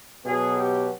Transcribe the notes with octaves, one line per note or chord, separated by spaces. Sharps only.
B2 F#3 B3 G#4
G4